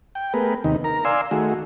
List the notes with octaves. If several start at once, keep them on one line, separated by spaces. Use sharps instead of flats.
G5
A3 B3 G#4 A#4 B4
D#2 C3 D#3 D#4
A#4 A#5
D5 F5 G#5 C6 E6
D#3 A3 F#4 G#4